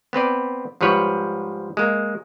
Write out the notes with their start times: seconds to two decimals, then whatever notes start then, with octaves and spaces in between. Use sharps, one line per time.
0.13 B3 C4 B4 D5
0.81 G#2 F3 G3 B4 C#5
1.77 G#3 A#3